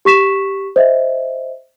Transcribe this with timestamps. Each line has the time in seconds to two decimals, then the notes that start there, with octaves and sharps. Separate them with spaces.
0.05 G4 C#6 B6 E7
0.76 C5 D#5 E5